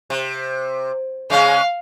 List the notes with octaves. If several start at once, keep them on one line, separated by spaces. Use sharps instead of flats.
C3
C#3 G#3 C#4 F5